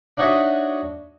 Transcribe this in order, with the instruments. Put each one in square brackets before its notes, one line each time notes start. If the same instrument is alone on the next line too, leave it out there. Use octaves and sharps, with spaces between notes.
[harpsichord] D4 D#4 F#4 C#5 D#5 E5